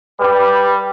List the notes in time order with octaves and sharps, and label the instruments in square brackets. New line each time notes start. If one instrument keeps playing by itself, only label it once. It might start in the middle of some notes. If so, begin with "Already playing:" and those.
[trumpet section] G3 [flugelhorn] B4